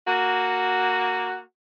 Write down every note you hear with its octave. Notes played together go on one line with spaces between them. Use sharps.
A#3 F#4